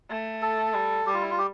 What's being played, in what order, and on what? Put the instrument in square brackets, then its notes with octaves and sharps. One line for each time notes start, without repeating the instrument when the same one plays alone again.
[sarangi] A3
[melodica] A4
[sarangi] G3
[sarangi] G3 [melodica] G4
[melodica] F4
E4
F4
G4